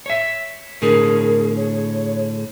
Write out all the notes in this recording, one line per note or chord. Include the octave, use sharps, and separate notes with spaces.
C#5 E5
A2 D3 G#4 A#4
C#5